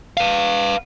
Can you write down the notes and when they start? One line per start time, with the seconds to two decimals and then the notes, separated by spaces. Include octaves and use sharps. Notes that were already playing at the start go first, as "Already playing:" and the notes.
0.17 B4 F5